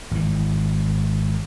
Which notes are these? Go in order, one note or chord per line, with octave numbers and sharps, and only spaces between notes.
G#1 E3